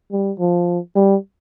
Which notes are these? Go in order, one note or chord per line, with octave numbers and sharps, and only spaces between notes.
G3
F3
G3